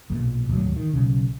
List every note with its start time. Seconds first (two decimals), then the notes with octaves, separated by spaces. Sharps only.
0.10 B1 A#2
0.49 D#1 G#1 D2 F#3
0.77 D#3
0.93 B1 C#3